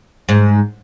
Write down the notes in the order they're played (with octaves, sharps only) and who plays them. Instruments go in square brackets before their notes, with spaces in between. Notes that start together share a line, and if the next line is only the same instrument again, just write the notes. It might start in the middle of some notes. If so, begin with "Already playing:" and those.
[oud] G#2